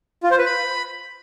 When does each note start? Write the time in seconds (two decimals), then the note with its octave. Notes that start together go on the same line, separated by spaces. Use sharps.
0.23 F4
0.31 C5
0.38 B4
0.46 B5